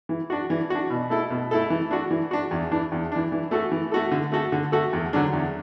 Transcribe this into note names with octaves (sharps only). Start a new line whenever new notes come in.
E3
D4 F#4
E3
D4 F#4
B2
A3 E4 A4
B2
A3 E4 A4
E3
D4 F#4
E3
D4 F#4
E2
E3 D4
E2
E3 D4
E3
A3 F#4 A4
E3
A3 F#4 A4
D3
A3 F#4 A4
D3
A3 F#4 A4
E2
D3 F#3 D4
E2